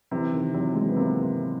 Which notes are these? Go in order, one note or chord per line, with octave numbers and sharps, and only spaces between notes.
C3 E3
D#3
C3 F#3
G#3
B3
C3 A#3